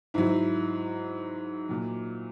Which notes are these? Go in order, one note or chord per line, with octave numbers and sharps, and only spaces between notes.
G#2 F#3 E4
A#2 F#3